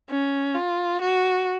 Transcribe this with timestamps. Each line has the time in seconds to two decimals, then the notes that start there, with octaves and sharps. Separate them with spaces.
0.10 C#4
0.55 F4
1.01 F#4